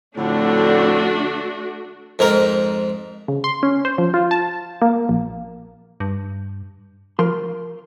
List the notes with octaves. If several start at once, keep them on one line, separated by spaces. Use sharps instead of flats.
F2 A2 D3 A3 D4 F#4
F2 G#2 A#4
C#3
C6
C#4
C5
F3
F4
A5
A#3
A#1
G2
F3 A#4 C6